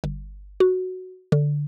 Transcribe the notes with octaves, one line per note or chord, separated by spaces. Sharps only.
G1
F#4
D3